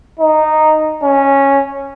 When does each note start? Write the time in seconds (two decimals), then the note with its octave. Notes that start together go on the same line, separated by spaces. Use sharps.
0.20 D#4
1.04 C#4